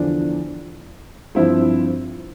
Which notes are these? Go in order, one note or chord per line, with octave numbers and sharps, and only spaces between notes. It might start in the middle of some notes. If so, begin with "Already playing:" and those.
Already playing: E2 D3 F3 D4
G2 F3 C4 E4